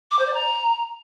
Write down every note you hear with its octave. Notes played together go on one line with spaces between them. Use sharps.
D6
C5
D5
A#5